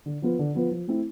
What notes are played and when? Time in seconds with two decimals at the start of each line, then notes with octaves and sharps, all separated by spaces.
0.06 D3
0.22 F3 B3 F4 B4
0.39 D3
0.55 F3 B3 F4 B4
0.71 F3
0.88 A3 C4 E4